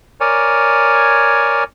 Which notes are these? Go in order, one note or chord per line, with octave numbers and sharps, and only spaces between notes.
A#4 C#5 D5 G#5